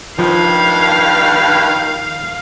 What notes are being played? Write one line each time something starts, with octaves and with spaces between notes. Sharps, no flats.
G2 D#3 F3 F5